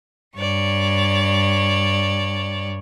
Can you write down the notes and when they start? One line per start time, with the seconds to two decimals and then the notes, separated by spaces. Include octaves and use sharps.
0.36 G2 C#5 D5